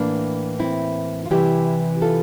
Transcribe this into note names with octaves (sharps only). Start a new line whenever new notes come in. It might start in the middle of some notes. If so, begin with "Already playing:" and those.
Already playing: A2 E3 A#3 D4
C4 E4
F4
C3 E3 G3 E4 G4
F4 A4